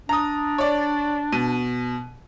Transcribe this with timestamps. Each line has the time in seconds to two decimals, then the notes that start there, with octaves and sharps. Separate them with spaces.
0.09 D4 A#5 D#6
0.58 C#5 D5
1.32 B2 D#7